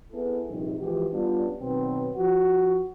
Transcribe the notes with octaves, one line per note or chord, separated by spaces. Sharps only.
B3 E4 G#4 A4
A#1 G2 C3 D#3
E3 F3 G#3 F#4 G4
G3 B3 C#4 D4 F4
B2 D#3 F#3 C4 B4
F3 F#4